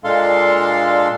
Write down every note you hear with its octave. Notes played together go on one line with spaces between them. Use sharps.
A#2 G#3 D4 A4 F5 C6